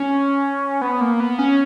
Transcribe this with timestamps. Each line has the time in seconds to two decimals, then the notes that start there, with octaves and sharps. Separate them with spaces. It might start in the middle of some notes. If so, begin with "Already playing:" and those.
Already playing: C#4
0.81 B3
1.01 A#3
1.20 B3
1.39 C#4